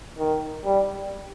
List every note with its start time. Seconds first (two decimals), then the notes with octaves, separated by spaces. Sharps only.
0.19 D#3
0.65 G3